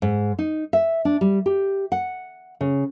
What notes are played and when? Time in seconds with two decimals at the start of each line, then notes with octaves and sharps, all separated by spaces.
0.02 G#2
0.39 D#4
0.73 E5
1.05 D4
1.21 G3
1.46 G4
1.92 F#5
2.61 C#3